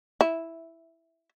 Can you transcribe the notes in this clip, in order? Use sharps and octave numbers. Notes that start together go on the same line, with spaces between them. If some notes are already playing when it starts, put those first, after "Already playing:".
E4